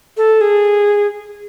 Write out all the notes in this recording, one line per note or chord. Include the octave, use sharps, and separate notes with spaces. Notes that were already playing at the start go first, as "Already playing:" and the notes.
A4
G#4